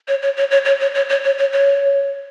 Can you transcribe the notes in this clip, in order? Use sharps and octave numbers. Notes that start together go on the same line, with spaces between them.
C#5
C#5
C#5
C#5
C#5
C#5
C#5
C#5
C#5
C#5
C#5